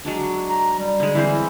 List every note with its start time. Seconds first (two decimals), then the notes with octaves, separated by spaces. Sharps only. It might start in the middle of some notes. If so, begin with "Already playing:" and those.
0.05 F#3 G#3 D4
0.50 A#5
0.79 G3
1.00 D3 G#3
1.15 E3 C4 C5